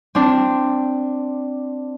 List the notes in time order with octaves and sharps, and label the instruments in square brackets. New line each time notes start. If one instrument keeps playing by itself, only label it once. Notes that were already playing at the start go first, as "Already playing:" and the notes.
[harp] C4 D4